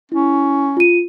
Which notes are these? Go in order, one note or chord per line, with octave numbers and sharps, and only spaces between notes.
C#4 E4
F4 D#7